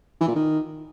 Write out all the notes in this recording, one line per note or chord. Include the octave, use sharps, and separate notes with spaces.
E3
A#2
D#3